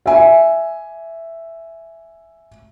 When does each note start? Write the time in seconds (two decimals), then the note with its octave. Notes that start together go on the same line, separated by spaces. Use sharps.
0.06 E5 G#5